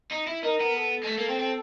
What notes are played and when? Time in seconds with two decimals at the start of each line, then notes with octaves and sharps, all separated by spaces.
0.12 D#4
0.27 E4
0.43 D#4 A#4
0.60 B3
0.75 A4
1.03 G#3
1.07 A3
1.18 A#3
1.28 C4
1.39 C4